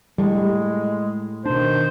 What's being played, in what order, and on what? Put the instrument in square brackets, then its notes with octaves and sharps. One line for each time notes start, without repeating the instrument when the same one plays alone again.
[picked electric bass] A2 [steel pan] G3 [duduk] G#3
[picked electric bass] B2 D4 [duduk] D#3 [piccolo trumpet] C5